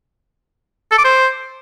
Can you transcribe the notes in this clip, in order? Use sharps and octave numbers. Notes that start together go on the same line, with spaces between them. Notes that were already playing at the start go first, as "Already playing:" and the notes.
A4
D6
C5